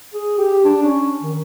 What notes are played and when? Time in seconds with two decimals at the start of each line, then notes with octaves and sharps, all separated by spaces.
0.14 G#4
0.38 G4
0.65 D4
0.83 C#4
1.23 D#3